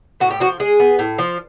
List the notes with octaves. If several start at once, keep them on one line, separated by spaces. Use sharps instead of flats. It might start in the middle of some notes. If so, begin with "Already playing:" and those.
A2 F#4
G4
F3 F#4
G#3 G#4
B3
A2
F3